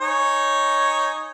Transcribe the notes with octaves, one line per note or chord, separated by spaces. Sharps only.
D#4 C#5 G#5